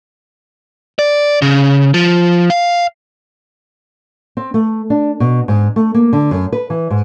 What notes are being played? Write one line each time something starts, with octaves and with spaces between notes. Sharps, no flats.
D5
C#3
F3
F5
C4
A3
D4
B2
G#2
A3
A#3
D3
F#2
B4
E3
G#2